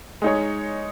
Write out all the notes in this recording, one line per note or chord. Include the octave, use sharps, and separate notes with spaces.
G#3 D#4 G#4 C#5